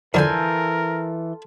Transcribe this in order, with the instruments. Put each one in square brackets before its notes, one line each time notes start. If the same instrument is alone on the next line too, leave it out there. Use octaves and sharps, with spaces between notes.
[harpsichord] F2 D3 [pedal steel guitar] E3 G6 [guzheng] F4 A4 G#5 [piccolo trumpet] A#4